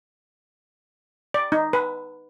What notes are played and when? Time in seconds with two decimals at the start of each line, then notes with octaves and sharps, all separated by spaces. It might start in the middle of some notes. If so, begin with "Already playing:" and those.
1.34 D5
1.52 D#4
1.73 B4